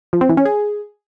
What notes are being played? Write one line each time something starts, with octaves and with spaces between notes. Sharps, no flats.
F3
C4
E3
C#4
G#4